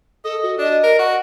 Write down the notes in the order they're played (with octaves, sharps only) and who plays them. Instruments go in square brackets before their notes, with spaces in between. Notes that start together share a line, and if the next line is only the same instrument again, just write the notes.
[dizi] A4 [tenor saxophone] D#5
[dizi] F#4
[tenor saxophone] D4 [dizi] D#5
[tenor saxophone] A#4
F#4